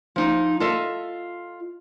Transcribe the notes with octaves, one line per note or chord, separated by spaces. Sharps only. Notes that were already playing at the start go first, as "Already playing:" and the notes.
F3 D#4
F4 A4 D#5 E5